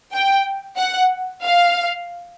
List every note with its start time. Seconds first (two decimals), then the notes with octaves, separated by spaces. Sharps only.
0.13 G5
0.78 F#5
1.43 F5